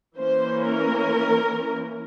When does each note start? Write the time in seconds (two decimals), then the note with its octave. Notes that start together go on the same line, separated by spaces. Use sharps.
0.17 E3 A#3 C#4 C5
0.67 A#4